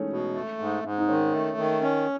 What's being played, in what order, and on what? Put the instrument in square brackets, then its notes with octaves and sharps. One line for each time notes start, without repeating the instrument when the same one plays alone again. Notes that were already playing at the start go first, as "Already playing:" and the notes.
Already playing: [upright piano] E3 G#3 A3 C#4 D#4
[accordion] B2
A3
G#2
G#2
[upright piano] D#4
[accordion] D#3 [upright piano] C#4
[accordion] A3
D#3
C#4